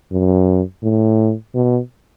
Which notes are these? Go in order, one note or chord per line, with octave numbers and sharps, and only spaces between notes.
F#2
A2
B2